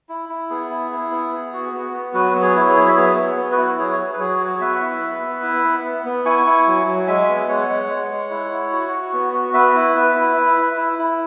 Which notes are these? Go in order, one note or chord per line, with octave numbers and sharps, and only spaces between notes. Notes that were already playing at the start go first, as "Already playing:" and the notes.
E4
E4
B3 G#4
E4
E4
B3
B3
F#4
B3
B3
F#3 F#4 B4
B3
G#4 C#5
E4
G#4 C#5
F#3
E5
B3 G#4 C#5
B3
B3
F#4 B4
E4
F#3 G#4 C#5
F#3
B4
F#3 G#4 C#5
F#4
B3 B4 E5
E4
B3
B3
E4
B3
B3
B3
E4 G#5 C#6
E4
F#3
F#3
G#3 E5 G#5
B3
G#3 C#5 F#5
G#3
G#3
G#3
E4
E4
F#4
F#4
B3
F#4
B3 B4 E5
E4
B3
E4
E4
E4
E4
E4